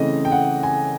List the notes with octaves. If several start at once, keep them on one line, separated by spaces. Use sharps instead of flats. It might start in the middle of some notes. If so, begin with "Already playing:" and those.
Already playing: C#3 E3 A3 C4 D#5
G5
F#5
G#5